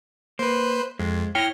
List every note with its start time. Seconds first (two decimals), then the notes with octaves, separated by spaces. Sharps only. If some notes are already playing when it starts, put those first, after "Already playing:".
0.39 A#3 B4 C5
1.00 F2 G#3
1.35 E4 C#5 G5 F6 A#6